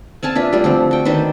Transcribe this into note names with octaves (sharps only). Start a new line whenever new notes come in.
C4 F5 G#5 A5
D4 F4 B4 E5
G3 A3 F4 G4
D3 F3 C4
F#4 G5
D#3 D4 B4 C5